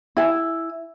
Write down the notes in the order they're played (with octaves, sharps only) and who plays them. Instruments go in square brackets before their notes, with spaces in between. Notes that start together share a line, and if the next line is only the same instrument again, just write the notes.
[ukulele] E4 G#5